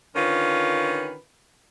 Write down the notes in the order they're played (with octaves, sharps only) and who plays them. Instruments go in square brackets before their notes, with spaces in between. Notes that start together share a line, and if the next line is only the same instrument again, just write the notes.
[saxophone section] D3 D#3 C#4 F4 A#4 B4